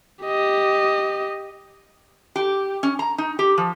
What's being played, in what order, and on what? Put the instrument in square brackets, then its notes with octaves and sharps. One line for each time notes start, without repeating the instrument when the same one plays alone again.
[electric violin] G4 D#5
[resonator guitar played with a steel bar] G4
C#4
A#5
D#4
G4
F3